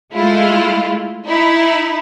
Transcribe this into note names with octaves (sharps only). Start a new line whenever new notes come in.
G#3 A3 E4 F4
D#4 E4